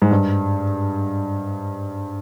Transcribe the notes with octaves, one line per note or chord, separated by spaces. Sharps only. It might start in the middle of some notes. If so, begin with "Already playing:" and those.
G#2
G2